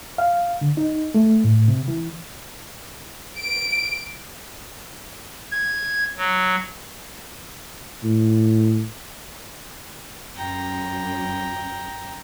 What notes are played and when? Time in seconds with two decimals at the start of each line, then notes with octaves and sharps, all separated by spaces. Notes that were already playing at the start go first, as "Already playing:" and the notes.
0.18 F5
0.61 D3
0.77 D#4
1.15 A3
1.44 A2
1.68 C3
1.88 E3
3.38 D7
5.51 G#6
6.17 F#3
8.04 A2
10.36 F#2 G5 A#5